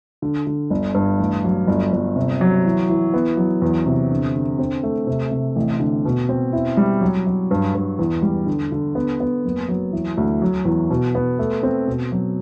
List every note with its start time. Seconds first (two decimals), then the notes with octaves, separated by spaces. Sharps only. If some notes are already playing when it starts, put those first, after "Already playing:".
0.22 D3
0.47 D3
0.70 G1
0.94 G2
1.20 A1
1.44 F#3
1.67 G1
1.93 G1
2.16 C3
2.41 F#3
2.65 E3
2.90 E3
3.14 B3
3.37 F#3
3.62 E2
3.86 C3
4.11 D3
4.35 D3
4.59 C4
4.83 A3
5.07 C3
5.31 C3
5.56 A1
5.80 D3
6.05 B2
6.29 C4
6.53 E4
6.77 G3
7.01 F#3
7.27 F#3
7.51 G2
7.75 G2
7.99 E2
8.22 G3
8.47 D3
8.72 D3
8.95 B3
9.20 B3
9.45 F#1
9.68 F#3
9.93 E3
10.17 D2
10.42 F#3
10.65 E2
10.90 B2
11.15 B3
11.39 A3
11.63 C4
11.88 B2
12.12 F#3